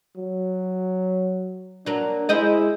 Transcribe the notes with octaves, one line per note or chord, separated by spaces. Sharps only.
F#3
F#3 A#3 D4
G#3 E4 C5 D#5